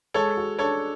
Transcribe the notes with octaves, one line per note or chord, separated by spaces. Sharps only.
G#3 A4 C#5
F#4
D4 A4 C#5